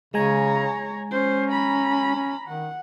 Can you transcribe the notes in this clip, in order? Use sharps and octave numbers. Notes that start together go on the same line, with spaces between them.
C#3 G#3 C#5 G#5 A#5
C#4 C5
A#5 B5
C#4
D#3 F#5